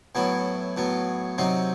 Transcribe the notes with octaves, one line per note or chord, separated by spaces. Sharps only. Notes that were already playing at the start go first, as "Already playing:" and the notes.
A2 F#3 B3 E4
A2 F#3 B3
C3 F#3 C4 D#4